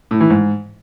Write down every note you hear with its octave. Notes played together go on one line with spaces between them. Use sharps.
A2
E3
G#2